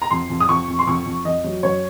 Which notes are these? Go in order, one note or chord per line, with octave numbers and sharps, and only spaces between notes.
A#5
F2 C6
F2
D#6
F2 C#6
F2
C6
F2 C#6
F2
F2 D#5
F#3
F#2 C#5